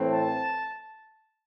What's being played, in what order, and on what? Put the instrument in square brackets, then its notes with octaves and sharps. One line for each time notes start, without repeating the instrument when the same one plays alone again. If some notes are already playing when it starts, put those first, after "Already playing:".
Already playing: [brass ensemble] A2 E3 A3 C4
A5